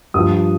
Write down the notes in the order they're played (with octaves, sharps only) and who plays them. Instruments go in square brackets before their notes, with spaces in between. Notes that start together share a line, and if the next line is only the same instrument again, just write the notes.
[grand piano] G2 F3 D#6